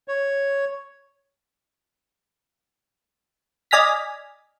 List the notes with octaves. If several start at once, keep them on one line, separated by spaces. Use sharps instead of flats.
C#5
D5 D#5 G#5 F6 A#6 B6